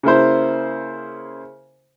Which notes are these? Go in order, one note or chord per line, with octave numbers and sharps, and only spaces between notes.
C#3 A#3 E4 C5